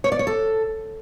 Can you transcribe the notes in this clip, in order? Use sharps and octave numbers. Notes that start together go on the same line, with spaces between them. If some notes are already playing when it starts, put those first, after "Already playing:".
C#5
D5
C#5
A4